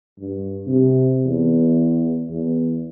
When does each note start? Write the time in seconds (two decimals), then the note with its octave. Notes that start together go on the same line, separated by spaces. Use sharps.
0.19 G2
0.67 C3
1.26 E2
2.29 E2